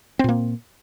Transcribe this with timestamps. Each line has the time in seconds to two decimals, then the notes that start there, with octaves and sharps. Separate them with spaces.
0.19 C4
0.24 A#2
0.29 A#3